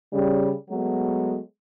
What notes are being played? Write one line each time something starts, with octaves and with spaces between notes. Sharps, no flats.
C#3 G3
F#3 G#3 A3 B3 F#4